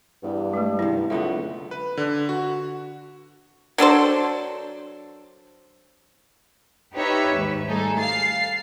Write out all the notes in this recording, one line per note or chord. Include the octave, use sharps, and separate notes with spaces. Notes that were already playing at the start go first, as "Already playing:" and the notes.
E2 G2
G#3 A3
G#1 F#2 C3 E4
C#2 D3 A3 B3 E5
B4
D3
F#4
F#3 D4 A4 C5
D#4 G4 B4 C#5 E5
D#2 G#2
G3 A3 D#4 G#4 A4
F5 A6 C7